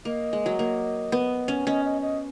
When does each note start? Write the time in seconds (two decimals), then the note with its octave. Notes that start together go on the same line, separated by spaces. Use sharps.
0.05 A#3 D#5
0.33 G#3
0.46 F#3
0.59 A#3
1.12 B3
1.48 C#4
1.67 C#4 D#5
1.85 D#5
2.02 D#5